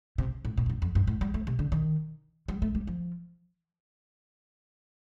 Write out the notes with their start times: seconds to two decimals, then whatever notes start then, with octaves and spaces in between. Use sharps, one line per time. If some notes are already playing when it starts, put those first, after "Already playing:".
0.18 C3
0.45 A2
0.57 A#2
0.66 F2
0.70 G2
0.82 F2
0.95 G2
1.07 A2
1.21 G3
1.34 A3
1.47 C3
1.59 D3
1.72 D#3
2.48 G3
2.62 A3
2.75 G3
2.87 F3